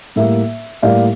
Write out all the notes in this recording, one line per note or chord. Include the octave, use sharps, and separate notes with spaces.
A2 G3 A#3 E5
A2 G3 A#3 D5 F5